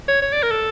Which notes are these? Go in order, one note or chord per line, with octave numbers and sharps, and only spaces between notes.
C#5
C#5
D5
A#4
A4